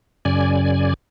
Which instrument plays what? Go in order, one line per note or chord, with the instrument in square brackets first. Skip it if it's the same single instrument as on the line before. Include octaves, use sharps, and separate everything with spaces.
[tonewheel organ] F#2 C#3 D5 G#5